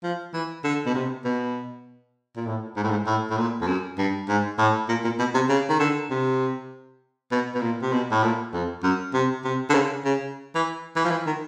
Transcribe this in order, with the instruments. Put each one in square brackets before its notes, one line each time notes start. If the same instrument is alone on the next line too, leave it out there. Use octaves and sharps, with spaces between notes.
[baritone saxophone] F3
E3
D3
B2
C3
B2
A#2
A2
G#2
A2
G#2
A2
A2
A#2
F2
F#2
G2
G#2
A2
A#2
A#2
B2
C3
C#3
D#3
D3
C3
B2
B2
A#2
C3
B2
A2
A#2
F2
F#2
C3
C3
D3
C#3
C#3
E3
E3
F3
E3
D#3